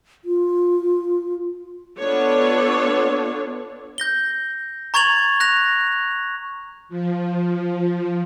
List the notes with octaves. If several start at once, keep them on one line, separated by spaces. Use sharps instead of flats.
F4
B3 D4 F4 A4 C#5
G6 A#6 G7
A#5 C#6 G#6 A6 F7 F#7
F#6 A#6 F7
F3